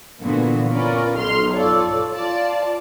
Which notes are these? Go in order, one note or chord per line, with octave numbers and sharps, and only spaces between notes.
A#2 D3 E3 B3 F#4
C#4 F4 A#4 B4 D5
B1 F#3 D#4 C6 F6
F4 A4 C#5 D5
F4 D5 A5